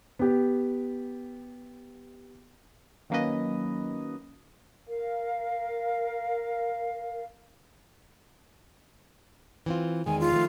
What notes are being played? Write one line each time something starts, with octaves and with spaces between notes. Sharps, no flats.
B3 G4
D#3 F#3 A#3 C#4 B4 D#5
A#4 F5
E3 C4 F4
E2 D#3 G#3 G#5
F4
D#3 F3 A3